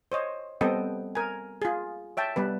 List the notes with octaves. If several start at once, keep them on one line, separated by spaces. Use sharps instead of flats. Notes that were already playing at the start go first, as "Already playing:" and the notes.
C5 C#5 D#5
G3 B3 C4 A4 D#5 G5
A#4 G#5
F4 G#4
C#5 E5 G5 A5
G3 B3 B4